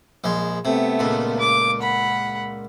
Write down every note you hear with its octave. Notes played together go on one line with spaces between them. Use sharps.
A#1 G#3
C3 A3 B3
C#2 A#2
D6
F#5 B5